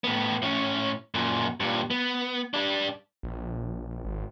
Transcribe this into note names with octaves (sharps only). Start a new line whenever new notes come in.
A2 B3
A2 C#4
F#2 A#2
G2 A#2
B3
G3 D4
A#1
G#1